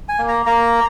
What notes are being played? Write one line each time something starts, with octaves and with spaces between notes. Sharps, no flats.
G#5
A#3
A#5
A#3 A#5